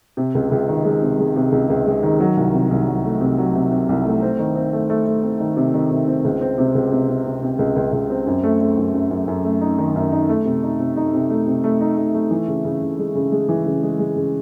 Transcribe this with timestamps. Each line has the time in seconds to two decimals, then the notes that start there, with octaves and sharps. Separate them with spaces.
0.17 C3
0.35 C#2
0.52 C#2
0.68 D#3
0.85 G#3
1.02 C3
1.19 G#3
1.36 C3
1.52 C#2
1.70 C#2
1.86 G#3
2.03 D#3
2.20 F#3
2.37 C2
2.53 C3
2.71 C2
2.88 F#3
3.05 A3
3.21 C3
3.38 F#3
3.55 C3
3.72 C3
3.89 C2
4.05 A3
4.22 C4
4.39 D#3
4.56 C4
4.73 A3
4.90 A3
5.07 A3
5.23 C4
5.40 D#3
5.57 C3
5.74 D#3
5.91 C3
6.08 C4
6.25 C#2
6.41 C4
6.58 C3
6.75 C#2
6.92 C3
7.09 C3
7.25 C3
7.42 C3
7.59 C#2
7.76 C#2
7.93 C#2
8.10 C4
8.27 F#2
8.44 A3
8.60 A3
8.77 F#2
8.94 F#2
9.11 F#2
9.28 F#2
9.45 A3
9.61 D#4
9.78 D#3
9.96 F#2
10.12 D#4
10.29 A3
10.45 C3
10.63 D#4
10.79 C3
10.96 D#4
11.14 C3
11.30 A3
11.47 C3
11.64 A3
11.81 D#4
11.97 A3
12.14 A3
12.31 E3
12.48 C#3
12.64 C#3
12.81 C#3
12.99 G#3
13.15 C#3
13.32 G#3
13.49 E3
13.66 C#3
13.83 G#3
13.99 G#3
14.16 C#3